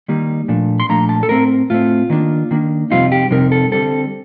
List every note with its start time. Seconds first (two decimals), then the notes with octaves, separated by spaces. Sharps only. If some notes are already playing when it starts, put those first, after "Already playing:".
0.08 D#3 G3 A#3 D#4
0.48 A#2 F3 A3 D4
0.80 C6
0.89 A#2 F3 A3 D4 A#5
1.09 A5
1.23 A4
1.29 A2 A3 C4 A#4
1.70 A2 A3 C4 F4
2.10 D#3 A#3 D4
2.51 D#3 A#3 D4
2.90 F2 C3 G3 C4 D#4 F4
3.12 G4
3.31 F2 C3 G3 C4 D#4 A#4
3.52 A4
3.72 D3 G3 C4 A4